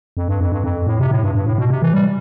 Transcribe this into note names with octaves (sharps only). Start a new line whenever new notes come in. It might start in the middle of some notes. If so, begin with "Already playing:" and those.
F2
G2
F2
G2
F2
A2
C3
A2
G2
G2
A2
B2
C3
E3
G3